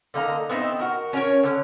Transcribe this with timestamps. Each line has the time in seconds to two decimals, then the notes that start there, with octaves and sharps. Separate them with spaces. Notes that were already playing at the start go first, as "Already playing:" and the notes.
0.14 D3 A#3 D#4 A#5
0.49 B3 C4 D#4 E4
0.79 F#4 A#4
1.13 C#4 A#4 C#5
1.43 D3 C#4